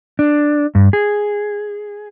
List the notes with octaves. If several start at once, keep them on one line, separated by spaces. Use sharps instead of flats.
D4
G2
G#4